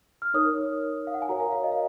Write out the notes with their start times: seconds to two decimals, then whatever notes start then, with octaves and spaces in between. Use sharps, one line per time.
0.22 F6
0.34 D#4 A#4 C#5 D#6
1.07 F5
1.14 F#5
1.22 G#5
1.29 F#4 A#4 C#5 A#5
1.40 F5
1.52 F5
1.63 D#5
1.72 F5